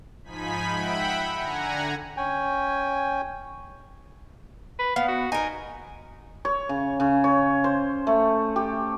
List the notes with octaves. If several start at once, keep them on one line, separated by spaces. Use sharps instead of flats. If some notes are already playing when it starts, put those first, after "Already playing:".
G#2 F3 D#4 G#5 B5 B6
E5 F#5 G5 B5
D3 F#5 G#5 A#5
C#4 G5 G#5
B4
B3 F5
F#4
D#4 A#4 G#5
C#5
C#3
C#3
C#5
C5
A3
G4